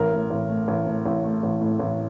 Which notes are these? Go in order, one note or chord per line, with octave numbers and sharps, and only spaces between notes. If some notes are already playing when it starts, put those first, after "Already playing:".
Already playing: A1 A#4
A2
A1
A3
A1
A2
A1
A3
A1
A2
A1